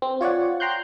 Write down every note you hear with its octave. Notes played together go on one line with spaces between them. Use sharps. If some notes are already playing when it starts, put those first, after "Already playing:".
C4
F4 C#5 D5 F#5
G5 A#5 C6 F#6 G6